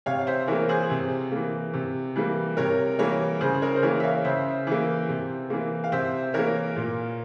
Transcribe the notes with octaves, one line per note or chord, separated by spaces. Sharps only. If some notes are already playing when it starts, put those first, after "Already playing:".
C3 C#5 F5
F5
C5 E5
E3 A#3 A#4 C#5
G#4 C5
C3
E3 A#3
C3
E3 G3 A#3
C3 A#4 C#5
E3 G3 A#3 A#4 C#5
C#3 G#4 C5
A#4 C#5
C5
E3 A#3 A#4 C#5
E5
C#5 F5
C#3 C5 E5
E3 A#3
C3
E3 A#3
F5
C3 C5 E5
E3 A#3 A#4 C#5
A#2